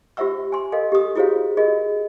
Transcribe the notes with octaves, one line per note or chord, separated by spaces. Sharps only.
F4 G4 C5 E5 F#5 E6
G#5 C6
A4 A#4 D#5 F5
G4 D#6
E4 F#4 G#4 C5 C#5 F5
F4 G#4 A#4 D#5